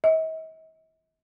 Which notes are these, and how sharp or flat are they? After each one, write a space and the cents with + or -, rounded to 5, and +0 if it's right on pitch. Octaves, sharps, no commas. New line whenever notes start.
D#5 +45